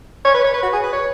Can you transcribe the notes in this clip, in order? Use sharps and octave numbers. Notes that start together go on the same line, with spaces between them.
C#5
B4
C#5
B4
F#4
G#4
B4
C#5